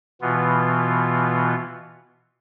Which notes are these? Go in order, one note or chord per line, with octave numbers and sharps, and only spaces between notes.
B2 E3 B3 F4